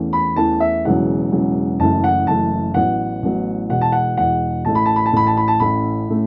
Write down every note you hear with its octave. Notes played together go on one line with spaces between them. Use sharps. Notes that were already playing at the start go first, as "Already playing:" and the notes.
Already playing: E2 E3 A3 C#4
B5
E2 E3 A3 C#4 A5
E5
E1 E2 C#3 F#3 F#5
E1 E2 C#3 F#3
F#1 F#2 E3 A3 A5
F#5
F#1 F#2 E3 A3 A5
A1 A2 F#3 B3 F#5
A1 A2 F#3 B3
E1 E2 B2 F#5
A5
F#5
E1 E2 B2 F#5
A1 A2 A3 A5
B5
A5
B5
A5
A1 A2 A3 B5
A5
B5
A5
A1 A2 A3 C#4 B5
A2 A3 C#4